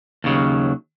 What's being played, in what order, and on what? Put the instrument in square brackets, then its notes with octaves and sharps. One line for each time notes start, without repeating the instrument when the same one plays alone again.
[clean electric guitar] D#2 C#3 F#3